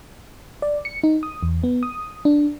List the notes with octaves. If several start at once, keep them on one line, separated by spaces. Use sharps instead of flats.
D5
C#7
D#4
D#6
E2
B3
D#6
D4